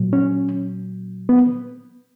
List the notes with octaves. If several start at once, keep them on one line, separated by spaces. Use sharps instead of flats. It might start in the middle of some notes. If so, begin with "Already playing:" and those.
Already playing: A#2 F#3
C#4
B3